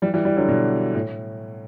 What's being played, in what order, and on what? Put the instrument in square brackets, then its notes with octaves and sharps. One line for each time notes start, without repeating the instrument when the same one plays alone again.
[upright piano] E3 G3
E3 G3
E3 G3
D3 F#3
B2 D3
A2